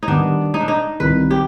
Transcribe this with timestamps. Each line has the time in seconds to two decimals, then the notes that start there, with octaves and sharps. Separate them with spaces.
0.03 D#4
0.08 D#3 G3 B3 D4
0.54 D#4
0.61 D4
0.68 D#4
1.00 C2 C3 D#3 B4
1.31 G4